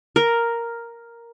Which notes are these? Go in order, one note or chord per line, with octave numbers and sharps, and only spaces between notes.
A#4